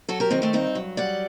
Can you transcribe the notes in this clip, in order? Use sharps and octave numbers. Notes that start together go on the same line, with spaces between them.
F#3 F#4 A4
G4 A#4
D#3 C4 D#4
A3 C4
G2 C4 D#4
F#3
G3 D5 F#5